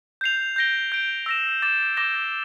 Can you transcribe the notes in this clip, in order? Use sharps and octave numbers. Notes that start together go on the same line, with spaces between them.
G6 C7 F7
G6 A#6 D7 G7
G6 D7 G7
E6 A#6 E7
D6 A6 E7
D6 G6 A#6 E7 G7